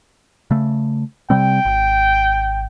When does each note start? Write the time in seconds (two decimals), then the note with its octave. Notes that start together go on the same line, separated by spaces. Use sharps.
0.51 C#3 A3
1.30 C3 G3 C4 G5
1.65 G#1